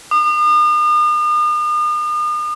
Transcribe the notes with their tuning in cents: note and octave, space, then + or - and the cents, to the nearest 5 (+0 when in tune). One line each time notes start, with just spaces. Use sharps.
D#6 -40